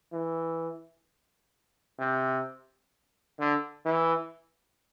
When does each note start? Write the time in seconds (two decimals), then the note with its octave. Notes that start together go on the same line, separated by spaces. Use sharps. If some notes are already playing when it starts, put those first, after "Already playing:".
0.12 E3
1.99 C3
3.39 D3
3.85 E3